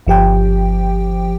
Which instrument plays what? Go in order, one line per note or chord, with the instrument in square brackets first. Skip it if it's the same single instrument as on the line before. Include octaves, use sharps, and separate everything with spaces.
[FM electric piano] G1 F3 G4 G5